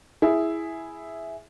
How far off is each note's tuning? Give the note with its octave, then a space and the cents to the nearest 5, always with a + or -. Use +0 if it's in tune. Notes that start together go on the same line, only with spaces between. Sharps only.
E4 +0 G#4 +0